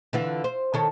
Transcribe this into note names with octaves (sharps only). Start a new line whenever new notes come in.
D3 E3 F4
C5
D#3 A4 C#5